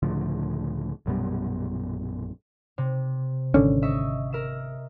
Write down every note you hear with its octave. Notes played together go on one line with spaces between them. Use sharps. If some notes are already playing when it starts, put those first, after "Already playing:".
C#2 A2 D3 F3
A#1 F#2 B2 G3
C3
G#1 D3 C#4
D#5 E5 C#6
A#4 E5 E7